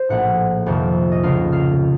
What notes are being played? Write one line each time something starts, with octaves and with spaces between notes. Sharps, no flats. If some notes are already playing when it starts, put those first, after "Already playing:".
Already playing: C5
A#1 A2 F#5
F1 F2 D#3
D#5
C#2 C#3 F5
F5